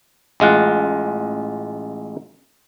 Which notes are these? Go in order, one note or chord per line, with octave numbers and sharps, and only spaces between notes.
A1 G#3 F4 F#5